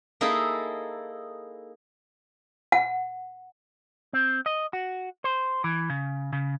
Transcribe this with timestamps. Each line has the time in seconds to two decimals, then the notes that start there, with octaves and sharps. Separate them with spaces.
0.21 A#3 D#4 E4 G#4 A4
2.72 F#5
4.13 C4
4.46 D#5
4.73 F#4
5.24 C5
5.64 E3
5.90 C#3
6.33 C#3